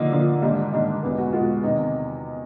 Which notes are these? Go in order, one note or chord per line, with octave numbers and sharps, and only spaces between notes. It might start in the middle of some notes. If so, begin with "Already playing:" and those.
Already playing: D3 F3 A#3 D#4
D3 F3 A#3
G#2 D#3 G3 A#3 D4
G#2 D#3 G3 A#3 D4
E2 B2 G#3 B3
F#4
E2 B2 G#3 B3 F4
E2 C3 D#3 D#4